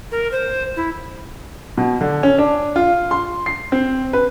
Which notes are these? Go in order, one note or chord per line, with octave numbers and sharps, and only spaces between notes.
A#4
C5
E4
B2
D3
C#4
D4
F4
C6
C7
C4
B4